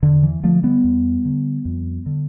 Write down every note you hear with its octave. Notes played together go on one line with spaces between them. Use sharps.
E2 D3
E3
D3 F3 A3
G3 B3
E2
D3
F2
D3